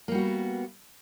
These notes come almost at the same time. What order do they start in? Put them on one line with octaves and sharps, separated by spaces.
A#3 G3 F#4 B3